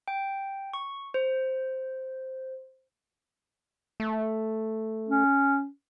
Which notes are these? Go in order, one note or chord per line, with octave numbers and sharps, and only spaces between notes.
G5
C#6
C5
A3
C#4